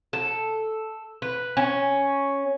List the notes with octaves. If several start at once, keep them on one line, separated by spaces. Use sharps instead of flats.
A4
B4
C#4